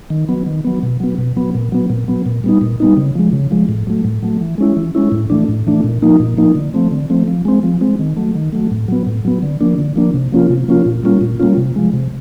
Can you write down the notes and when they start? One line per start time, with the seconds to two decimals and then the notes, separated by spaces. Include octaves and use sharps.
0.10 D#3
0.29 F#3 B3
0.46 D#3
0.64 F#3 B3
0.83 B2
1.00 F#3 B3
1.18 B2
1.36 F#3 B3
1.54 A#2
1.72 F#3 B3
1.90 A#2
2.08 F#3 B3
2.26 A#2
2.44 G3 B3 D#4
2.61 A#2
2.80 G3 B3 D#4
2.97 C#3
3.15 F3 G#3
3.33 C#3
3.51 F3 G#3
3.69 A2
3.87 F#3 A3
4.05 A2
4.22 F#3 A3
4.41 E3
4.58 G#3 C#4 E4
4.77 E3
4.95 G#3 C#4 E4
5.12 A2
5.30 E3 A3 D4
5.49 A2
5.67 E3 A3 D4
5.84 A#2
6.02 F3 A#3 D#4
6.20 A#2
6.37 F3 A#3 D#4
6.55 D3
6.74 F3 A3 C4
6.91 D3
7.10 F3 A3 C4
7.28 F3
7.45 G#3 C4
7.63 F3
7.81 G#3 C4
7.99 D#3
8.17 F#3 A3
8.35 D#3
8.53 F#3 A3
8.71 A2
8.88 F#3 B3
9.07 A2
9.25 F#3 B3
9.43 D3
9.61 F3 A#3 D4
9.78 D3
9.96 F3 A#3 D4
10.14 C3
10.32 F3 A#3 C#4 F4
10.50 C3
10.68 F3 A#3 C#4 F4
10.86 A#2
11.03 G3 A#3 C#4 F4
11.21 A#2
11.40 G3 A#3 C#4 F4
11.57 C3
11.76 F3 G#3
11.93 C3